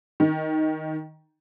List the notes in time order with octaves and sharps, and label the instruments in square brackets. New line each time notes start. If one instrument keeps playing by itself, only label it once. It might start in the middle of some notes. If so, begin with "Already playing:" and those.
[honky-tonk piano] D#3